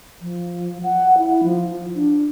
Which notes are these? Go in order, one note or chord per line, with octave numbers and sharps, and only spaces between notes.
F3
F#5
E4
F3
D4